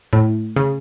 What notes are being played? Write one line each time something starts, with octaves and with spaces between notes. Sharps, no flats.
A2
C#3